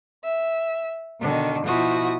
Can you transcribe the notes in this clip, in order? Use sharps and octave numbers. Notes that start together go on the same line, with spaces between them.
E5
B2 D3 D#3
B2 F3 E4 F#4 D#6